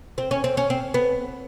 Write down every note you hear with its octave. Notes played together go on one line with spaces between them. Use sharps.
C4
C#4
C4
C#4
C4
B3